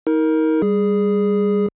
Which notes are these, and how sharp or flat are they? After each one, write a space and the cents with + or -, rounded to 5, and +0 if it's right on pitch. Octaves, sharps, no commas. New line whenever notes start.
D#4 +35 A#4 +0
G3 +10 G#4 +0